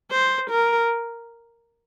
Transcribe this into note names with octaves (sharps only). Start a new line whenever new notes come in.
C5
A#4